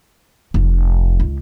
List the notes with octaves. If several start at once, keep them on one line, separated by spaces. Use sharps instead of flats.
F1
C#2